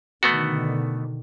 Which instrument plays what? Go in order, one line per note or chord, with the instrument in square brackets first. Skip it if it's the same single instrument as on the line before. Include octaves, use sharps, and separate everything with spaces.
[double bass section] B2 D3 D#3 [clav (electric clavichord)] A3 B3 F#4